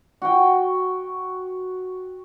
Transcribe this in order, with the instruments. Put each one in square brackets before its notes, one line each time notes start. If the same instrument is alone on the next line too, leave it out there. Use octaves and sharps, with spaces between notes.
[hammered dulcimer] F#4 G5